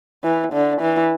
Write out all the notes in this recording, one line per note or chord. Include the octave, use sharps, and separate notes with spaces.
E3
D3
E3